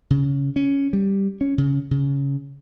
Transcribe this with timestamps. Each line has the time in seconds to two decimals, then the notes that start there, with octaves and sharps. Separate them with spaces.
0.10 C#3
0.56 C#4
0.93 G3
1.41 C#4
1.58 C#3
1.91 C#3